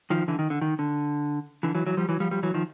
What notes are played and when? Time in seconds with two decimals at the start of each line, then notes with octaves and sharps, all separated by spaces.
0.10 D#3 F3
0.28 D3 E3
0.39 D#3
0.50 D3
0.61 D#3
0.79 D3
1.63 D3 E3
1.75 E3 F#3
1.87 E3 F#3
1.97 F3 G3
2.09 E3 F#3
2.20 F3 G3
2.31 F3 G3
2.43 E3 F#3
2.54 D#3 F3